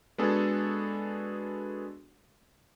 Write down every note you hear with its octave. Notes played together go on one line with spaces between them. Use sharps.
G#3 B3 D4 F#4 G#4 A4